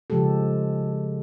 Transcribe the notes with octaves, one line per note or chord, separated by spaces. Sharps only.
C#3 F3 G#3 G4 A4